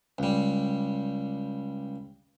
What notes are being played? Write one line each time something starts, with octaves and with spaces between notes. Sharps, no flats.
C#2 G3